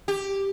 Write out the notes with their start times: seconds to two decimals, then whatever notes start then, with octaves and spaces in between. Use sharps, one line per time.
0.08 G4